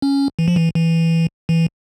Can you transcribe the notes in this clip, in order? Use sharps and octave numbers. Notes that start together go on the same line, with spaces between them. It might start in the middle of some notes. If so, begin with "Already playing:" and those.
C#4
E3
F3
E3
E3
E3